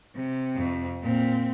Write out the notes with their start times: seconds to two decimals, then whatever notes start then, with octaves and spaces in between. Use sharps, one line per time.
0.16 C3
0.56 F2
1.03 A#2 C4